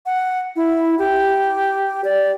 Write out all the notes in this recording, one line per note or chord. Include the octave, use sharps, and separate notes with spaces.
F#5
E4
G4
D5